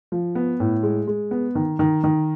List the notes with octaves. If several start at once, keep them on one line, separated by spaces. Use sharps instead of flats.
F3
B3
A2
G#3
G#3
B3
D#3
D#3
D#3